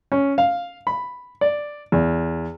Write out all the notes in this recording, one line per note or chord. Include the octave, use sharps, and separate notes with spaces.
C#4
F5
B5
D5
E2